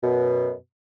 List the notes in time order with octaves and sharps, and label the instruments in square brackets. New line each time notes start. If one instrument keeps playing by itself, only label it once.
[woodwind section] F#2 B2